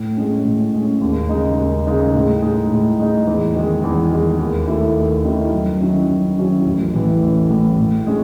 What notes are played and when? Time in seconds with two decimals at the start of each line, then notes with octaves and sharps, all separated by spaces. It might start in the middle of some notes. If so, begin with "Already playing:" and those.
Already playing: A2
0.17 G#3 C#4
0.45 A2
0.73 G#3 C#4
1.01 D#2
1.29 C#3 G#3 D#4
1.58 D#2
1.87 C#3 G#3 D#4
2.15 A2
2.42 G#3 D#4
2.71 A2
2.99 G#3 D#4
3.27 E2
3.55 D#3 G#3
3.84 E2
4.11 D#3 G#3
4.39 D#2
4.68 D#3 A3 E4
4.96 D#2
5.25 D#3 A3 E4
5.53 F#2
5.80 D#3 F#3 C#4 E4
6.09 F#2
6.38 D#3 F#3 C#4 E4
6.66 A1
6.94 A2 E3
7.22 A1
7.50 A2 E3
7.78 A2
8.07 G#3 C#4